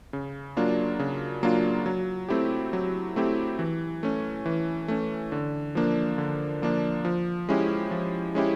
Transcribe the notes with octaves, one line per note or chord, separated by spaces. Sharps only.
C#3
F#3 A#3 D4 F4
C#3
F#3 A#3 D4 F4
F#3
A3 C4 E4 G4
F#3
A3 C4 E4 G4
E3
A3 C#4
E3
A3 C#4
D3
F3 A#3 D4
D3
F3 A#3 D4
F3
G#3 C#4 E4 G4
F3
G#3 C#4 E4 G4